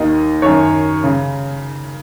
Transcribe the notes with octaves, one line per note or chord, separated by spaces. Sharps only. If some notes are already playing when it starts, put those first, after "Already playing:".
Already playing: D#2 D#3 D#5
F#2 D#3 C#5
C#3